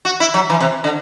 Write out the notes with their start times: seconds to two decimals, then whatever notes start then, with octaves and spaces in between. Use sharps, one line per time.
0.05 F#4
0.20 E4
0.34 F#3
0.50 E3
0.60 C3
0.84 D3